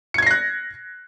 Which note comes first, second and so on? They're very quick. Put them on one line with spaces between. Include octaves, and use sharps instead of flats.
C#7 G#6 C7 A#6 F#6